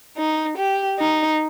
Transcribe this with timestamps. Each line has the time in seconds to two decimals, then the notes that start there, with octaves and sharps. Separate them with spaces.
0.17 D#4
0.58 G4
0.99 D#4